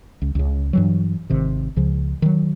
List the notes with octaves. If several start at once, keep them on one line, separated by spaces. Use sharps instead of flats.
C#2
C#2 C#3
G2 E3 F#3
G#1 C3 D#3
C#2 C#3 F3
D#3 F#3